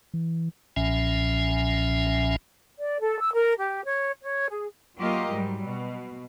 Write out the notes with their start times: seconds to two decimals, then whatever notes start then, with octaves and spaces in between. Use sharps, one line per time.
0.14 E3
0.76 B1 A#2 F3 C#4 E5 G#5
2.80 D5
3.00 A4
3.19 E6
3.33 A#4
3.57 G4
3.84 C#5
4.22 C#5
4.49 G#4
4.98 F#3 A#3 F4 G4 A#4 D#5
5.29 G#2 F#3 G3
5.65 B2